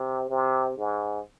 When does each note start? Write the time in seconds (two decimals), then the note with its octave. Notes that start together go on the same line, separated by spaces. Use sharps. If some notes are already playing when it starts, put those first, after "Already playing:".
Already playing: C3
0.30 C3
0.77 G#2